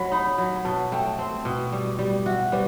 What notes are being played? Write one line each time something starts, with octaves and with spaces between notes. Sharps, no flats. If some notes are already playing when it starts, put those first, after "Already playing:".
Already playing: F#3 B5
D#4 B5
F#3
B2 A5
A3 G5
C4
B2
G3
G3
F#4 E5
G3 B4